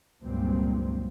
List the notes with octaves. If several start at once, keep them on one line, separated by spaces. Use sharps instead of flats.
C#2 G2 A#2 F#3 C4